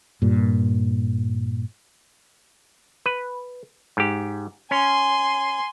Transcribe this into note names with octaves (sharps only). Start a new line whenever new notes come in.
G2 A#2
B4
G#2 G4
C#4 G#5 C6